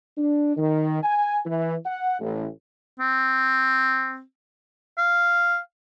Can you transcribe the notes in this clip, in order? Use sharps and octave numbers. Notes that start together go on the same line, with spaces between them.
D4
D#3
G#5
E3
F#5
A1
C4
F5